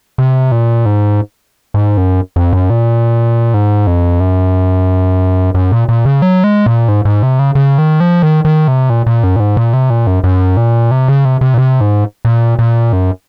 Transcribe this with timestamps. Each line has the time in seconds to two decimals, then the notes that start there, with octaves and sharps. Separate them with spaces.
0.18 C3
0.52 A#2
0.86 G#2
1.74 G#2
1.97 F#2
2.36 F2
2.53 F#2
2.70 A#2
3.54 G#2
3.87 F2
4.20 F#2
5.54 F#2
5.72 A#2
5.89 A#2
6.05 C#3
6.22 F#3
6.44 G#3
6.66 A#2
6.88 G#2
7.05 G#2
7.23 C3
7.39 C#3
7.55 C#3
7.78 D#3
8.00 F3
8.23 D#3
8.45 D#3
8.68 C3
8.90 A#2
9.06 A#2
9.24 F#2
9.36 A#2
9.40 G#2
9.57 A#2
9.73 C3
9.90 A#2
10.07 F#2
10.24 F#2
10.57 A#2
10.91 C3
11.08 C#3
11.25 C3
11.41 C3
11.54 A#2
11.58 C3
11.81 G#2
12.25 A#2
12.59 A#2
12.93 F#2